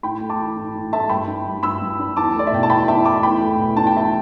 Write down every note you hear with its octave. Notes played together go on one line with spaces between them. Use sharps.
A2 G5 B5
A3
A5 D6
E3
A2
A2
A3 E5 A5
G2 G5 B5
D4
G3
G2 B5 E6
G2
D4
E2 A5 D6
A3
D5
E5
B2 G5
A5
E2 G5 B5
E2 E5 A5
A3 A5 D6
E2 G5 B5
A3
B2
D4 A5
G5
E2 E5 A5